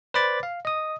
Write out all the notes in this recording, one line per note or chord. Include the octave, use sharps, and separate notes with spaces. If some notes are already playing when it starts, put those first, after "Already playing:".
B4 C5 D5 B5 D6 A6
F5
D#5 D#6